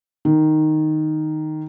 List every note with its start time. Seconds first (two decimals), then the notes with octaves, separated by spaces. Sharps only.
0.25 D#3